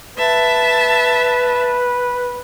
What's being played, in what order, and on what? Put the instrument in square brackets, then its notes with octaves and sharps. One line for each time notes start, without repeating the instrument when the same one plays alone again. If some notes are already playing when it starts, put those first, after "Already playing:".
[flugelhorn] B4 [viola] E5 A5